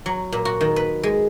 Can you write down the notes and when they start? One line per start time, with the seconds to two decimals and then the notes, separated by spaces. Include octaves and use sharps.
0.06 F#3
0.32 A#2
0.45 F#4
0.61 D#3
0.76 B4
1.03 G#3